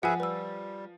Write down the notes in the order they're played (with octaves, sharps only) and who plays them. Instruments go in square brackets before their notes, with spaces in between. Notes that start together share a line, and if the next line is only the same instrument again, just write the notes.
[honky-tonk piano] F3 [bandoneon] G#4 B4 E5 [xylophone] F#5 G#5
[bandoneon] G3 [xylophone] B4 E6